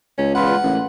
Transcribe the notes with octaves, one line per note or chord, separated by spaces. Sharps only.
C#2 C#4
E2 F4 B4 F#5
A1 A#3